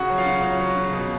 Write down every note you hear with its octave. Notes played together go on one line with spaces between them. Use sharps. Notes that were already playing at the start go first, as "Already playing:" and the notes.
Already playing: C#3 F#4 F#5
F#3
F4 F5
C#3
F#3
F#3
C#3
B2